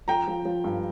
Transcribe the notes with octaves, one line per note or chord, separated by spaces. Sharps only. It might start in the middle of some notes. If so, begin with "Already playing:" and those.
F3 G5 A#5
F3
F3
G2